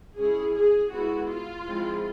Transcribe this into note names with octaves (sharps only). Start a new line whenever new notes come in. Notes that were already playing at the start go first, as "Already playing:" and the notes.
G#3 C#4 E4 G#4
G#4
G#3 B3 E4 F#4
F4
F3 G#3 C4 E4